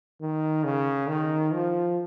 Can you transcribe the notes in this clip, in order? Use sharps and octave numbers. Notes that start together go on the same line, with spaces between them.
D#3
C#3
D#3
F3